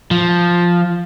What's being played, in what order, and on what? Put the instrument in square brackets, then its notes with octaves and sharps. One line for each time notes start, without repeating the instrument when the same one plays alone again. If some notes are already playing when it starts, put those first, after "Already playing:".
[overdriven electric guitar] F3